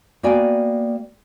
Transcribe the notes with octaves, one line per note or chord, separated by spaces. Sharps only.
A#3 B3 F#4 D5 G5 G#5